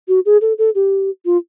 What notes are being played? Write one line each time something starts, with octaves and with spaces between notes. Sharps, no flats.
F#4
G#4
A4
A4
G4
F4